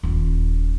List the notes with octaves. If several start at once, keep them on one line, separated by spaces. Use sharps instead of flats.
D#1